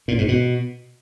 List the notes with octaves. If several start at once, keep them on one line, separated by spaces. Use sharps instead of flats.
A#2
G#2
B2